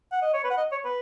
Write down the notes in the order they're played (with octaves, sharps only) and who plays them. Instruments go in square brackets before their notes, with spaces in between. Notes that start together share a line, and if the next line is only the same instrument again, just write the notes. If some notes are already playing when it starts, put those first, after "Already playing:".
[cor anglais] F#5
D#5
C#5
B4
F#5
D#5
C#5
B4